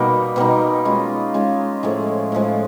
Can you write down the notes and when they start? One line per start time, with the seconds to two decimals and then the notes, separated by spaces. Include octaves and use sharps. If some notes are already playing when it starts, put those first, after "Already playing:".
Already playing: B2 G3 A#3 D#4
0.36 B2 G3 A#3 D#4
0.85 G#3 C#4 F4
1.34 G#3 C#4 F4
1.83 A2 F3 G#3
2.32 A2 F3 G#3